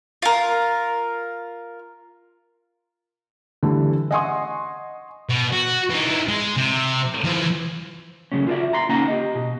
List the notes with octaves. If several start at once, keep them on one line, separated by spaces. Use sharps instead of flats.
F4 A#4
D3 E3 G3 A3
D#5 F#5 G#5 C6 C#6 D#6
B2
F#4
E3 D#4
G#3
C3
E3 F3
C#3 F#3 A3 C#4
F4 F#4 A4 D5 E5
F4 A#5 C6
C#3 A#3 C#4 D#4 F#5 A#5
G4 D#5
B2